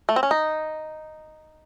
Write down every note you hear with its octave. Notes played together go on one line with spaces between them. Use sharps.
A3
C4
C#4
D#4